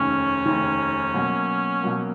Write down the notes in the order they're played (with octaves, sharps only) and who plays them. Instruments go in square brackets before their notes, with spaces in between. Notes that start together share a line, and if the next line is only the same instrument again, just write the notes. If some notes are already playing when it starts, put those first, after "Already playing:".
Already playing: [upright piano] F1 D#2 C#3 [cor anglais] C#4
[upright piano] F1 D#2 C#3
B2 F#3 A#3
B2 F#3 A#3